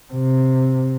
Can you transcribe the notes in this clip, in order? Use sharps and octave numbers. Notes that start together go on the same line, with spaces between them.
C3